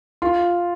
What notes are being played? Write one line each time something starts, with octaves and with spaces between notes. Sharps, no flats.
F4